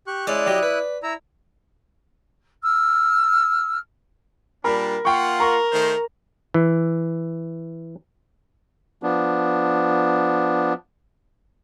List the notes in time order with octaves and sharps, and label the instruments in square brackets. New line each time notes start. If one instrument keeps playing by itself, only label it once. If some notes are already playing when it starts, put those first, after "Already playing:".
[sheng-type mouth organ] G4 C#6 F#6
[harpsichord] G#3 C#4 [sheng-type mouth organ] E4 D#6 F#6 [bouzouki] D5
[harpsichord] F#3 G4 D#5
B4
[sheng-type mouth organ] E4 A#5 E6
[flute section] E6 F6
[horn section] A#2 G3 D4 [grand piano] A#4 B5
[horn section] A#3 F4 F#5 [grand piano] G5 C#6
[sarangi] A#4 [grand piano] A#5 C#6
[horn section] D#3 A3 C5
[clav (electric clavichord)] E3
[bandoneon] F3 B3 D4